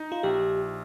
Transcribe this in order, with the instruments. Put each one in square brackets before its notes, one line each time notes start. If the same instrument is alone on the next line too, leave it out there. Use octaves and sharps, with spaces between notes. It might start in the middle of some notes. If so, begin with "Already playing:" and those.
Already playing: [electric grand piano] D#4
[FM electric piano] F4
[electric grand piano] A#1 [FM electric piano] G4